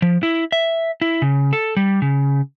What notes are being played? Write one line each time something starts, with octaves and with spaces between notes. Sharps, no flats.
F3
E4
E5
E4
C#3
A4
G3
C#3